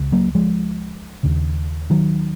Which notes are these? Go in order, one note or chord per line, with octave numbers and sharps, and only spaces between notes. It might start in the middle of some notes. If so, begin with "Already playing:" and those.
Already playing: C#2
F#3 A#3
F3 G#3
D#2 C#3
D#3 F#3